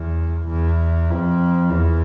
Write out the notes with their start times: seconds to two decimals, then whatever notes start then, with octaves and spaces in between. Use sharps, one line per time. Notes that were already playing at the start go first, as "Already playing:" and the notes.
Already playing: E2
0.49 E2
1.10 F2
1.70 E2